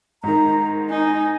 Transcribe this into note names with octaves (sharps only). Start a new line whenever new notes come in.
G#2 D#3 A#5
D#4 G#5